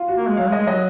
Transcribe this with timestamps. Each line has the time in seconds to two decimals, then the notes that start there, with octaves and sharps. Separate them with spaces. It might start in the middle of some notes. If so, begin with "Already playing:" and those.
Already playing: F4
0.08 F#4
0.17 A#3
0.27 G#3
0.37 F#3 F5
0.47 G#3
0.52 D#5
0.58 G#3
0.67 F#3 D#5